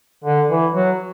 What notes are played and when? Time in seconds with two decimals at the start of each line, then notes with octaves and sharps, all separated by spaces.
0.24 D3
0.49 E3
0.74 F#3